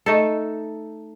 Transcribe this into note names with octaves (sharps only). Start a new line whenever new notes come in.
A3 D#4 A4